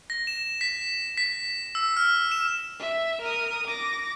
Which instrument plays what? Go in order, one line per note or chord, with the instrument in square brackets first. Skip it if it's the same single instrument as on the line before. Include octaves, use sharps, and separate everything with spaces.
[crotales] A#6
E7
B6
B6
E6
F6
E7
[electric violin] E5
A#4 D#6
D6 A#6